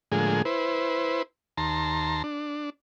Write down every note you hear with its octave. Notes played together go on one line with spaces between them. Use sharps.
A2 D3 F3 G#3 A#3 G#4
E4 B4 C5
D#2 A5 A#5 C6
D4